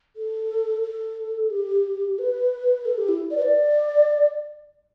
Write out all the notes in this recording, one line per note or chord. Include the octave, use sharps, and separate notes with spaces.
A4
A4
G4
B4
A4
G4
E4
D5
B4
D5